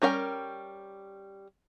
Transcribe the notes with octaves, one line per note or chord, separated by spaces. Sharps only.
G3 C#4 A#4 F5 G5